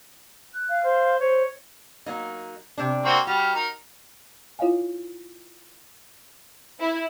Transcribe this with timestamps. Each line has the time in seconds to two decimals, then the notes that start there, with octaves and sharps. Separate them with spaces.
0.54 F#6
0.69 F5
0.83 C5
1.20 C5 C#5
2.06 F#3 A#3 D#4
2.78 C3 D4
3.05 A#3 C4 F#4
3.27 G3 F#4 F6
3.55 D#4 A#4
4.59 E4 F4 C#5 D#5 F5 G#5
6.80 E4